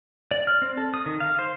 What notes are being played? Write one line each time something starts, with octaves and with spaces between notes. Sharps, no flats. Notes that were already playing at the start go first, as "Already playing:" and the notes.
D5
F6
C4
A4
D#6
D#3
F5
C5